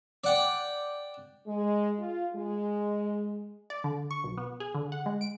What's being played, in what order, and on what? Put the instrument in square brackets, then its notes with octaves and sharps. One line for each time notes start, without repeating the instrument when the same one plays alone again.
[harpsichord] D5 F#5 G5
[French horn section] G#3
F4
G#3
[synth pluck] D5
D3
C#6
B1
B3
G#4
D3
F#5
G#3
D7